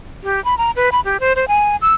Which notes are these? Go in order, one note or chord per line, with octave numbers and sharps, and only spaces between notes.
G4
B5
A#5
B4
B5
G4
C5
C5
G#5
E6